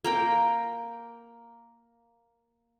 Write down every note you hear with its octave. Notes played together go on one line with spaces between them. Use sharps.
A#3 A#4 G5